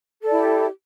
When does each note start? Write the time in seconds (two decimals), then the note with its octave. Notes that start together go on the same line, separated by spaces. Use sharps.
0.22 A4
0.26 D5
0.31 E4
0.36 G4